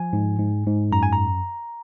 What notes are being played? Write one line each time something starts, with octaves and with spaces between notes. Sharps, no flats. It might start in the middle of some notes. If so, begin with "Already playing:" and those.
Already playing: F3 G#5
G#2
G#2
G#2
F#2 A#5
G#5
A#5